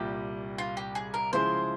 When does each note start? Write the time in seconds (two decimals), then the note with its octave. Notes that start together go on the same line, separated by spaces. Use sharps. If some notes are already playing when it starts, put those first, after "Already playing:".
Already playing: C2 A#2 G3 G4
0.58 F4
0.77 G4
0.95 G#4
1.14 A#4
1.33 C#3 F3 G#3 E4 G#4 C5